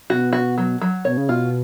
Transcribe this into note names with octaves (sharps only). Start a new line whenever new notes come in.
B2 F#4
F#4
F#3
F#3
B2 C#5
C#3
B2 F4